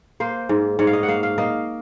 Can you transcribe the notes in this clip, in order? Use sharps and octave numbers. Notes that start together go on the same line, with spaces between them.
A#3 C5
G#2
G#2 C#5
F5
D#5
F#5
A#3 F5
F5
A#3 D#5